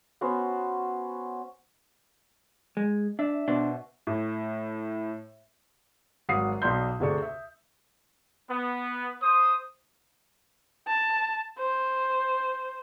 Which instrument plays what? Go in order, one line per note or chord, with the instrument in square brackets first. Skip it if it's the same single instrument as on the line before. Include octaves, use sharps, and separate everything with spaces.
[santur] B3 C#4 F#4 C5
[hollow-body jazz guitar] G#3
[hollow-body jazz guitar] D4 [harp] E5
[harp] B2 [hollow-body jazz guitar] D4 C5
[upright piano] A2
[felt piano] G#1 F#3 F5 F#5 D#6 C7
B1 D5 C6 G6
D2 C3 G#4 A4 D5 C#6
E5
[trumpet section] B3
C5 D#6
[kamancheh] A5
C5